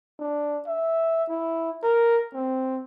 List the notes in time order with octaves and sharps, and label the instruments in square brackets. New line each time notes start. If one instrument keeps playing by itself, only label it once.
[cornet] D4
E5
E4
A#4
C4